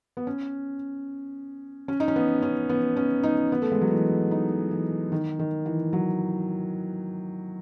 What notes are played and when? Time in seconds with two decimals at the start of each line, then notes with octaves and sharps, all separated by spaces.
0.17 B3
0.27 C#4
1.88 C#4
2.00 D#4
2.08 C#4
2.16 B3
2.42 C#4
2.69 B3
2.97 C#4
3.23 D#4
3.52 B3
3.62 A3
3.72 G#3
3.81 F#3
3.91 E3
4.31 D#4
4.71 E3
5.12 D#3
5.39 D#3
5.66 E3
5.93 F#3